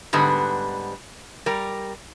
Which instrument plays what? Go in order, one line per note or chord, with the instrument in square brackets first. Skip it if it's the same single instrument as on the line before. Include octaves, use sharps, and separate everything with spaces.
[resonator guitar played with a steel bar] G#2 D3 G3 B3
G3 A#4